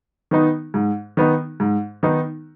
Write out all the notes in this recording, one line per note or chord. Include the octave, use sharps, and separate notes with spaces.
D#3 B3 D#4
G#2
D#3 B3 D#4
G#2
D#3 B3 D#4